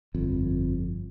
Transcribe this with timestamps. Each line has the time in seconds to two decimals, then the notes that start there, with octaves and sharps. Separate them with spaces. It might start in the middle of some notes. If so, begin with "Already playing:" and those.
0.14 G1 F2